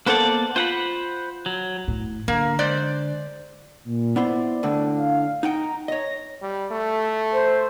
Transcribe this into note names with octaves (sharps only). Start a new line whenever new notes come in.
A#3 B3 A4 C5 D5 F#5
F4 C5 F#5 B5
F#3
A2
D3 A#3
G#3 C5 D5
A#2
B3 E4 C5 D5
D2 A2 D3
F5
D#4 F#5 G5 A#5
C#5 D#5 A#6
G3
A3
C5